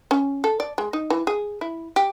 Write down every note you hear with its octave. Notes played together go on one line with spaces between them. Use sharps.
C#4
A4
D5
G#3
D#4
E3
G#4
E4
G4